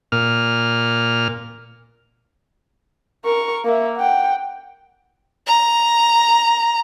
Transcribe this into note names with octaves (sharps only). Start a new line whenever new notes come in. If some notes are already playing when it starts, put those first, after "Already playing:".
A#2 F6
A#4 C#6
A#3 E5
F#5 G5
A#5